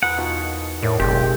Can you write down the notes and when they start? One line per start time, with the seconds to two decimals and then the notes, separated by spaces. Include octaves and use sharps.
0.03 E2 G#4 A#4 B4 F#5
0.18 B2 D#3 F3
0.83 A2 A#4 C#5 D5 E5
1.00 F#1 B2 D#3 G#3 C4 G4